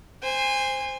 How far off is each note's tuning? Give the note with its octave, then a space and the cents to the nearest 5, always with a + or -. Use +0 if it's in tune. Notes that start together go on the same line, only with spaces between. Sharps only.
C5 +0 G#5 -30